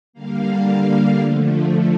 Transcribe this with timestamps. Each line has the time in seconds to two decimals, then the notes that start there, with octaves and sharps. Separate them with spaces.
0.13 D3 G3 A#3 F5
0.66 F5
1.18 D3 F3 A3